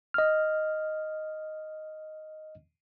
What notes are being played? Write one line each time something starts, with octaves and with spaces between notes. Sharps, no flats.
D#5 F6